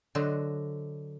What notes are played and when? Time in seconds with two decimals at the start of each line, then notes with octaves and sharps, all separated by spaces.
0.15 D3 F#3 C5 D#5